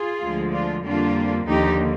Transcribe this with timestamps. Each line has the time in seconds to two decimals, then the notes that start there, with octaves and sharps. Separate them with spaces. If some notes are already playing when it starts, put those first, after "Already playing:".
Already playing: F4 G#4
0.21 D2 D3 F3 G#3
0.52 D4 F4
0.84 F2 D3 G3 A#3 D4 F4
1.47 D#2 D3 F3 A#3 D#4 G4